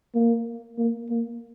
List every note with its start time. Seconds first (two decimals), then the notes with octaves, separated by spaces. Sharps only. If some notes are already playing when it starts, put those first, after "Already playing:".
0.15 A#3
0.78 A#3
1.10 A#3